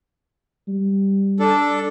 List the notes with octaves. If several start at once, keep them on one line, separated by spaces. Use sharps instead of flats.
G3
D4 A4